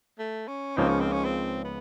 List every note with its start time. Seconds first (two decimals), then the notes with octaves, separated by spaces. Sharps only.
0.19 A3
0.48 C#4
0.77 C#2 C#3 F3 A#3 C4 D#4
0.89 C#4
1.00 C4
1.12 C#4
1.25 C4
1.64 B3